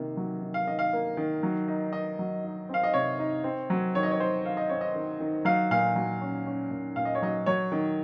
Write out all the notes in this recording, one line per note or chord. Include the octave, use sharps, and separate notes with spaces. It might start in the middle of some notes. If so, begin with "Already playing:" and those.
Already playing: C3 D#3 A#3
F#3
D#3
F5
D#3 D#5
F5
A#3
D#3
F#3
D#4
D#4 D#5
F#3
D#4
C4 F5
D#5
C3 C#5
D#4
C4
F#3
D#3 C#5
D#5
C#5
D#3 C5
D#3 F5
D#5
C4 C#5
D#5
D#3
D#3
F#3 F5
A#2 F5
F#3
C#4
C#4
A#2
A#2 F5
D#5
C#5
F#3 D#5
F#3 C#5
D#3